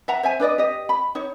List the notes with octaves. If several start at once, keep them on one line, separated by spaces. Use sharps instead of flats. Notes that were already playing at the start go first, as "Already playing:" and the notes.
E5 F#5 A#5
C5 E5 G#5
D4 B4 D5 D#5
G4 D#5
B5
D#4 C#5